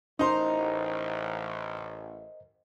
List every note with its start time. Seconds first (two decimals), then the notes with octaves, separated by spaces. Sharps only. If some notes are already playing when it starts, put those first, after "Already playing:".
0.19 A1 D#4 A#4 C5 D#5 A#5 C6